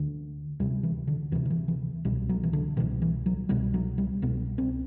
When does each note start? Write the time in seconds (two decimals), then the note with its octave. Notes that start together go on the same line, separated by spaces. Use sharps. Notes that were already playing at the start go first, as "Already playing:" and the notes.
Already playing: D2 D3
0.60 D2 C3 G3
0.83 E3
1.07 D3
1.32 D2 E3
1.35 C3
1.45 D3
1.50 E3
1.68 E3
2.05 C2 B2 G3
2.29 F#3
2.44 E3
2.53 D3
2.77 B2 E3
2.80 C2
3.02 E3
3.26 F#3
3.49 C2 B2 G3
3.74 F#3
3.98 G3
4.22 C2 B2 B3
4.58 C4